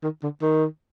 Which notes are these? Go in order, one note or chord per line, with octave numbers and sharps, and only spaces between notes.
D#3
D3
D#3